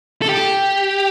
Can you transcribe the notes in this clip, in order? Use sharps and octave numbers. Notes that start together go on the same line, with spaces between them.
A4
G4